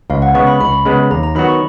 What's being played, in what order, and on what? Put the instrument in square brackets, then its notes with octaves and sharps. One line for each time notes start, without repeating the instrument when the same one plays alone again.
[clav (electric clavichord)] C#2 [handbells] F5
[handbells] F#5
[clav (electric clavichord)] C#3 G#3 B3 [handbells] C#6
[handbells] B5
[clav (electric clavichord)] C#2 [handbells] B5
[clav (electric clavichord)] C#3 G#3 B3
[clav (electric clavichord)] D#2 [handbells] A#5
[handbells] A#5
[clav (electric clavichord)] D#3 F#3 B3 F#4 [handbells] B5
[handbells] C#6